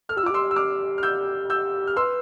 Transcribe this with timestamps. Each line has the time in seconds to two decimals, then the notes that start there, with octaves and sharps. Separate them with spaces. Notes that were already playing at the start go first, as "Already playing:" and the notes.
0.09 A4 F6
0.17 G4 E6
0.23 F4
0.26 D6
0.30 G4 C6 E6
0.51 E6
0.56 D6 F6
0.98 F6
1.03 E6 G6
1.50 E6 G6
1.87 F6
1.97 B4 C6 E6